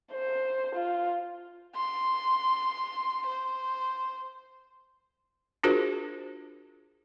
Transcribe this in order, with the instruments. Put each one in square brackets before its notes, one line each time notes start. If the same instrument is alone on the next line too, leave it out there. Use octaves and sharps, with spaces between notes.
[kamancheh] C5
F4
C6
C5
[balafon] D4 F4 F#4 G#4 A#4 C5